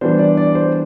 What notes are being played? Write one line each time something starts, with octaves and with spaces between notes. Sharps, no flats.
E3 G3 B3 D4 C5
D5
D5
C5